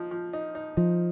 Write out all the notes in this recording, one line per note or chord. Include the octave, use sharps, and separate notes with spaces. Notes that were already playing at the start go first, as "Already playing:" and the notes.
Already playing: F3 D#4
F3
D#4
D#4
F3 D#4